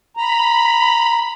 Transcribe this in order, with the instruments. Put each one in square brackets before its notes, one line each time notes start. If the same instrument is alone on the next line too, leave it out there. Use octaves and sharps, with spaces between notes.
[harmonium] A#5 [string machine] B5